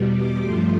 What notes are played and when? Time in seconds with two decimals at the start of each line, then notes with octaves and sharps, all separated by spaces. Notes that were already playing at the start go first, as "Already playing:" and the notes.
Already playing: E2 B2 G3
0.12 D6
0.42 G2 F3 A3 C6